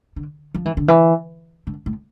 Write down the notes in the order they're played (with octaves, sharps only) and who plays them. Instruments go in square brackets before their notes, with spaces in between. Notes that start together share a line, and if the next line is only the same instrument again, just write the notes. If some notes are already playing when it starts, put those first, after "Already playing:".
[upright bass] D3
F3
E3
D3
E3
D3
A2